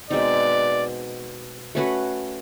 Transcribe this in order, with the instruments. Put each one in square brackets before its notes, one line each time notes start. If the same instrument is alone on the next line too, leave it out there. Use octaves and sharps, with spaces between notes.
[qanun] B2 G#3 C4 D#4 [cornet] D5
[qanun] A3 C#4 F#4 B4